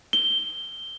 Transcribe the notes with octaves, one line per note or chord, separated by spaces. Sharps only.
G7